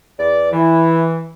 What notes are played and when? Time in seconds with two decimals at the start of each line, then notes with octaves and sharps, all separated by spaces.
0.19 E2 D5
0.52 E3 E4